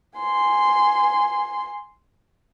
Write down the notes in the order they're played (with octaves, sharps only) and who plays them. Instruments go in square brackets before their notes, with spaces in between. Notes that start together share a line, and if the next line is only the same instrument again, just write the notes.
[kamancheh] G#5 C6